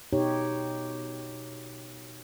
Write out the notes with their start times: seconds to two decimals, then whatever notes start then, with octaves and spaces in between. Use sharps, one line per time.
0.13 B2 D#4 G4 C#5